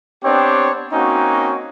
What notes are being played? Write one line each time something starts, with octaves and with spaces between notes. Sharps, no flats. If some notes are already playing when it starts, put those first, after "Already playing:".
B3 C4 D4 G4 B4 C#5
A#3 C4 C#4 D#4 F#4